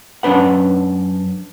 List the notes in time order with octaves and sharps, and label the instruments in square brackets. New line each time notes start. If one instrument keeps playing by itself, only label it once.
[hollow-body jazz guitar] F#2 C#4 D4 B4 F#5